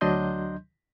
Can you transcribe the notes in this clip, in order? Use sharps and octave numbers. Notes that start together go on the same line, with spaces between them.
D2 F#3 D4 D#5 C6 G6